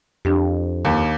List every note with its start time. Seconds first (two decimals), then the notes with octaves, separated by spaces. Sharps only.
0.25 F2 D4 G4
0.85 D#2